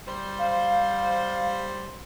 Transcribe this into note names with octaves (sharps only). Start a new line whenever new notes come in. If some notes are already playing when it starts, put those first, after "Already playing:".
G3 C5
F5